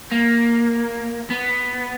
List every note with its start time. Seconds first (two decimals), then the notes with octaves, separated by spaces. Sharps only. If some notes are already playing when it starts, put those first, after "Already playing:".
0.11 A#3
1.30 B3